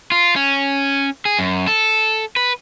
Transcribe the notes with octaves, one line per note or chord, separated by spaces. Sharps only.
F4
C#4
G#4
F#2
A4
B4